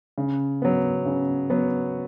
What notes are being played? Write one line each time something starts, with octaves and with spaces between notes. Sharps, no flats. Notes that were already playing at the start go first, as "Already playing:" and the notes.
C#3
F#3 B3
C#3
F#3 B3